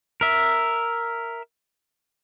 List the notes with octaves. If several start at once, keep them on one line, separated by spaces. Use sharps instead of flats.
A#4 E5